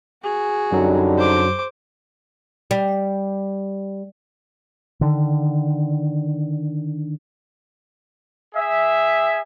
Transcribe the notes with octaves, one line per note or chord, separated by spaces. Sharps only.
F#4 G#4
F#2 D3 F#3 G3 D#4
C5 D6
G3
D3 D#3
G#4 E5